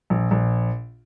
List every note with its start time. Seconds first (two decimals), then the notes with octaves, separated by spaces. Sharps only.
0.10 A#1
0.31 A#1